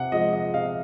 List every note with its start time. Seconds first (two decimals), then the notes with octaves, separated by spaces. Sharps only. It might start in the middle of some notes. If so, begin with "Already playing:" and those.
Already playing: C3 F#5
0.12 F3 G#3 D#5
0.33 D#5
0.54 C3 F5